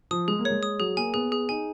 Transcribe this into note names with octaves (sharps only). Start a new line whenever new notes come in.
F3 D#6
G#3 G#4
A#3
C#5
G#3
D#6
F#3 G#4
A#3 G#5
B3 G#4
G#4
D#4 G#5